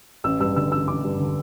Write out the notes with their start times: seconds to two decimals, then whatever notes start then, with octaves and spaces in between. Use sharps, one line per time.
0.24 A1 E6
0.40 G2 E6
0.56 D3 E6
0.72 A1 E6
0.88 A1 D6
1.04 G2
1.19 D3